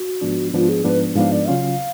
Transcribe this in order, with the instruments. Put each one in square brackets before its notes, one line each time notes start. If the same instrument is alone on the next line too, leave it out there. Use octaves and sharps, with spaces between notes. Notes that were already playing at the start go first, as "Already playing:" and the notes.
Already playing: [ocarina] F#4
[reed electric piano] G#2 F3 B3 D4
[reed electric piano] G#2 F3 B3 D4 [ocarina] F4
[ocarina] G#4
[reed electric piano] G#2 F3 B3 D4 [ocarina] B4
[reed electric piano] G#2 F3 B3 D4 [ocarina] F5
[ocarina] D5
[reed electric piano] C#3 F#3 C#4 F4 [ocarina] F5